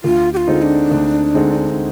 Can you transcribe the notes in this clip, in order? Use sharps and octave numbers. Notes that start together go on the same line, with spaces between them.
D2 F4
G4
F4
D3 G#3 C4 D#4
D4
D2
D3 G#3 C4 D#4